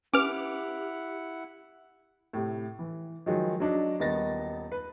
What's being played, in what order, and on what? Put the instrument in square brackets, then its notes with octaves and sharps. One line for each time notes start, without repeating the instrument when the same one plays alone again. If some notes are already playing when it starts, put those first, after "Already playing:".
[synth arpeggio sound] C#4 B4 [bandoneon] E4 F#5 [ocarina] G4 [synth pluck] D6 F6
[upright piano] A2 C3
E3
D#3 F3 F#3 G#3
F#3 D4 D#4
D#1 D#3 B3 D#4 A6 A#6
B4